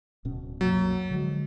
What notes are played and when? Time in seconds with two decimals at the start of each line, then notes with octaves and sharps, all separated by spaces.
0.25 D1 B2 C#4
0.61 C2 F#2 F#3 A#3
1.11 D3 F3 G#3